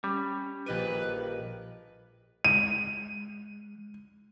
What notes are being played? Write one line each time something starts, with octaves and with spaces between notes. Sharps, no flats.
G3 C#4
A#1 G4 A#4 B4 D#5 D#7
G#3 D#7